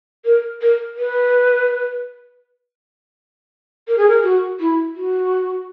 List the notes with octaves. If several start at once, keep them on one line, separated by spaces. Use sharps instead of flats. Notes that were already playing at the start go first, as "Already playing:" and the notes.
A#4
A#4
B4
A#4
G#4
A#4
F#4
E4
F#4